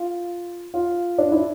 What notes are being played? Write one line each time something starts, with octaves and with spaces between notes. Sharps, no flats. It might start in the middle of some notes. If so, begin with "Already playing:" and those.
Already playing: F4
F4
D4
E4